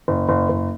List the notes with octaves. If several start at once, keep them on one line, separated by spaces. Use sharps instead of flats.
F#1
F#1
F#1